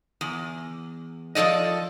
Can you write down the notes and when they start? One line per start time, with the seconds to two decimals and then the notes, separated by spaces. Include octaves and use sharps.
0.21 E2
1.35 F3 B3 A4 D5 D#5